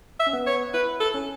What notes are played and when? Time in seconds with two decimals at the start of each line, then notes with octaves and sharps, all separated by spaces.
0.20 E5
0.27 C#4
0.33 B3
0.47 C#5
0.73 E4 B4
1.00 A4
1.14 C#4